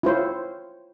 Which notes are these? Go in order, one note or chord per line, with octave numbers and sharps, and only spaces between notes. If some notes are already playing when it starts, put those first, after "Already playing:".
E4 F4 C5 C#5